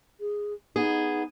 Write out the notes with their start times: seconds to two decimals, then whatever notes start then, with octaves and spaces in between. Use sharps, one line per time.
0.20 G#4
0.76 B3 D#4 G#4